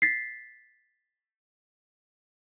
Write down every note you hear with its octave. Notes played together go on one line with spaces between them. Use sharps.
A6 B6 C7